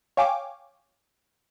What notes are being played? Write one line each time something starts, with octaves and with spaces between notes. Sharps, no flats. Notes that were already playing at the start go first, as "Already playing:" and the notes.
C#5 F5 G5 G#5 D6